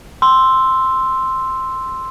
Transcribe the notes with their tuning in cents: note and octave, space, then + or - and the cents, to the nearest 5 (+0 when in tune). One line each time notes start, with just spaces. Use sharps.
C6 +0 E6 +0